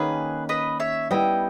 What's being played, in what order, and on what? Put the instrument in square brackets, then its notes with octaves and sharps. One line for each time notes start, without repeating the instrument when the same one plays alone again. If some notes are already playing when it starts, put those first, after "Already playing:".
Already playing: [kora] D#3 A#3 C#4 [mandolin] G#4 B4
[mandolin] B4 D#5
C#5 E5
[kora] G3 B3 E4 [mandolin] D#5 G5